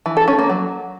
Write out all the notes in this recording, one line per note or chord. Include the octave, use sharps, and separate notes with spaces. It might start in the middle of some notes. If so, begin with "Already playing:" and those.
E3
A4
C#4
A#3
F#3